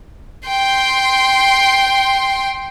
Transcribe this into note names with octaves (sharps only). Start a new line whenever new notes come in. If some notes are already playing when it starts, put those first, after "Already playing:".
G5 C6